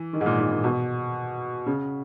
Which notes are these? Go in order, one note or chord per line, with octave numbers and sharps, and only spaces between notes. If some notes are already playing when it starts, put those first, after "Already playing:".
Already playing: E3
D#3
G#2
A#2
G#2
A#2
B2
C#3